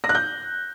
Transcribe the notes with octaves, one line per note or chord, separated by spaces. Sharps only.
A#6
F#6
G6